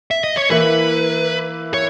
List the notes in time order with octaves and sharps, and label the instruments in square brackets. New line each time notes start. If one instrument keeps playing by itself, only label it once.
[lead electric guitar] E5
D#5
C#5
[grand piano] E3 A#3 E4 [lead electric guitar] B4
[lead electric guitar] C#5